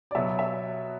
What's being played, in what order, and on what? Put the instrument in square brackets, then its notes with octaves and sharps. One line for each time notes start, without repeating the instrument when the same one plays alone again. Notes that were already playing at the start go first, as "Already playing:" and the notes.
[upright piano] D5
[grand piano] B2 F#3 B3 [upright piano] E5
[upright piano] E5